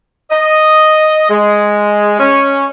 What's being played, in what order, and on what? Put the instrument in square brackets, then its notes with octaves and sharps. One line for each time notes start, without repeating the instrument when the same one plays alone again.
[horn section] D#5
G#3
C#4